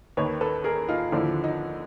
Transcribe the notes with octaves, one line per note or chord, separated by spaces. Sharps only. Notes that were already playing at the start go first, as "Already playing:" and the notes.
D#2 D#3 B4 C#5
A4 B4
G#4 A#4
D#4 F4
D#2 D3 F3 D4 E4
D#4